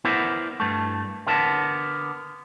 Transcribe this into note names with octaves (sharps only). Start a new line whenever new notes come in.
B3 E4 A#4 C5 D5
G2 A3
D3 B3 A#4 A5